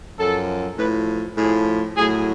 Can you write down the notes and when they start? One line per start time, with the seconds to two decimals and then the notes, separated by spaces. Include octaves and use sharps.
0.19 F#2 F3 A4
0.79 A2 F3 B4
1.38 A2 F3 G#4
1.97 A2 F#3 G#4